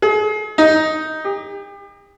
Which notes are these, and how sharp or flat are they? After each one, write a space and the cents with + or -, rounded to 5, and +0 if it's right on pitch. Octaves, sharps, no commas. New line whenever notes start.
G#4 +40
D#4 +5
G4 +40